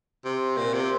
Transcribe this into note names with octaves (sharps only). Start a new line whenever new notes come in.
C3
A#2
C3